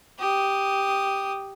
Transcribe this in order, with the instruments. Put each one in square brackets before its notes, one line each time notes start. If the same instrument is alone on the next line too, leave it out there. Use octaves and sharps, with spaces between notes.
[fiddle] G4 D#6